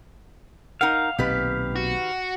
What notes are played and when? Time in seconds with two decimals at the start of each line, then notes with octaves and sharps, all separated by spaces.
0.81 D#4 A#4 F5 F#5
1.18 B1 A#2 D#3 C4 G4 B4
1.76 F#4